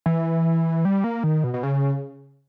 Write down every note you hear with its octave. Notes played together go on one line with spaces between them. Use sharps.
E3
G3
A#3
D#3
B2
B2
C#3